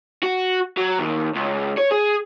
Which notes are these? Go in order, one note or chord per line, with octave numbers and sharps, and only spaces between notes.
F#4
F#3
D#2
C#2
C#5
G#4